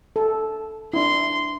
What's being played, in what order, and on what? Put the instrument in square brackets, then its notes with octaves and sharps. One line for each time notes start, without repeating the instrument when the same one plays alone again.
[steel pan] A4
[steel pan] D4 E4 [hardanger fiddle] C6